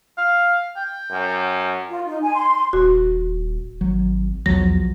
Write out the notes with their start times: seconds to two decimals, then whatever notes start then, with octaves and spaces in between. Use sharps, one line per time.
0.18 F5
0.77 G5
1.10 F#2
1.89 F4
2.06 D#4
2.22 G#5
2.34 C6
2.73 D#1 F#4
3.81 G#1 F#3
4.46 B1 E2 F3 F#3 A#6